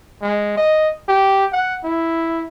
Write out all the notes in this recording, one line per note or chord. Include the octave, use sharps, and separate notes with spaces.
G#3
D#5
G4
F#5
E4